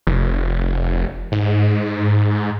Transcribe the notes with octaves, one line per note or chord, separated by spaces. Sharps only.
F1
G#2